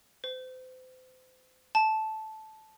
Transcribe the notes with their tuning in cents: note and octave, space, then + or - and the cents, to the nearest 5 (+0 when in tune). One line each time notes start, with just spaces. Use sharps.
C5 -35
A5 -10